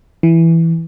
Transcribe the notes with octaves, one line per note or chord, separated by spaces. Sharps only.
E3